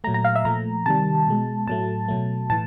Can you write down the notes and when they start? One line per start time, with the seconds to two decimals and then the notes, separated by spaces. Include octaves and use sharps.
0.04 A#2 F#3 A3 A#5
0.14 A#5
0.24 F5
0.35 E5
0.45 A#2 F3 A3 A#5
0.86 C3 D#3 G3 A5
1.28 B2 G#3
1.68 A2 F#3 A3 A5
2.08 B2 F#3 A3
2.50 A2 E3 A5